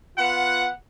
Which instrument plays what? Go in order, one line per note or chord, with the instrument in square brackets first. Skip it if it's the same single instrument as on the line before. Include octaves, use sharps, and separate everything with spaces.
[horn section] B3 F4 F#5